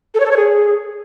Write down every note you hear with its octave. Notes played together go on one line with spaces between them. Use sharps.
A4
C#5
A4
C#5
G#4